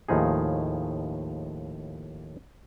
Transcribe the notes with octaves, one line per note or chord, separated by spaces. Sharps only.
D#2 A2 F3 D#4 G#4